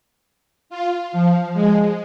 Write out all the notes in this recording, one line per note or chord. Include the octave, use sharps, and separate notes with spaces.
F4
F3
G#3